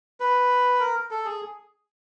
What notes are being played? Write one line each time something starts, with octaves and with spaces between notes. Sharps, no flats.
B4
A#4
A4
G#4